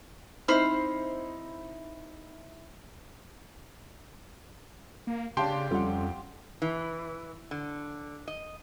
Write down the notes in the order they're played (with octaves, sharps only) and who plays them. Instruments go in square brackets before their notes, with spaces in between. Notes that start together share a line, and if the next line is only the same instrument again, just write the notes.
[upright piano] C4 D#4 E4 [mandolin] C5 B5 F6
[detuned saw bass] A#3
[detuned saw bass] C#3 [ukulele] D4 F5 A5 [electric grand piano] G4 G5 C6
[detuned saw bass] F2 [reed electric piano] G3 C#4 A4 [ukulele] F4 F#5
[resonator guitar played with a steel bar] E3
D3
D#5